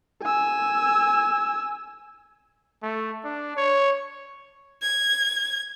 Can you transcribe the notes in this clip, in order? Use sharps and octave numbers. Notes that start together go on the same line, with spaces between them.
G#5 E6
A3
D4
C#5
G#6